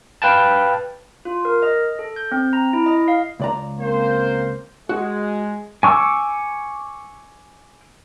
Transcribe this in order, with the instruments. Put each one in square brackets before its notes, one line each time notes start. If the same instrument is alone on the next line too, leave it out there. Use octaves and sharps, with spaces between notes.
[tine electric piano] B4 F5 G5 A5
[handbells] F4
A#4
D#5
A4
G6
C4
A#5
E4
D#5
F5
[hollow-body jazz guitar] C#2 D5 A#5
[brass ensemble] A#3 C4 C5
[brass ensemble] G#3 [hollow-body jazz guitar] F#4
[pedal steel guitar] G#5 C#6 D6 E6